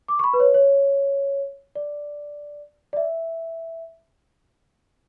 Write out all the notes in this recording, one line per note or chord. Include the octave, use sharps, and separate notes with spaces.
D6
C#6
B5
B4
C#5
C#5
D5
D5
E5